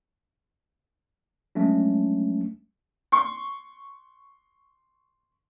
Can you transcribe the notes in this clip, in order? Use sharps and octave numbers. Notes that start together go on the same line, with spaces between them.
F#3 G#3 A3 C#4 D4
C6 C#6